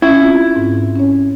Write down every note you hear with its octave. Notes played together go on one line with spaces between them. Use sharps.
C#4 E4
C4 F4
G#2
C#4 C#5